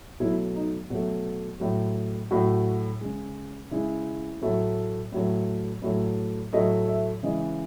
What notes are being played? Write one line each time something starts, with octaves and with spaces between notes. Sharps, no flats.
B2 F#3 A3 E4
D#4
B2 F#3 A3 F#4
A2 F#3 A3
A2 F#3 A3 F#4
C#3 G#3
C#3 G#3 E4
A2 F#3 A3
A2 F#3 A3
A2 F#3 A3
A2 F#3 A3 D#5
E5
C#3 E3 G#3 D#5